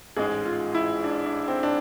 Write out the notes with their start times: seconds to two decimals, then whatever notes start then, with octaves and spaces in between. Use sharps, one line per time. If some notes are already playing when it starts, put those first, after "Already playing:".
0.16 A1 G#2 G#3 G#4
0.45 F4
0.74 E4
1.04 D4
1.26 D4
1.48 C4
1.63 D4